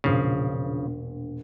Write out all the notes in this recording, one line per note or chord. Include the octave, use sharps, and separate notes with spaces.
E1 A#1 C#3 F3